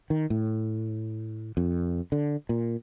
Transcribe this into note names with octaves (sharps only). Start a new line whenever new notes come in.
D#3
A2
F2
D3
A#2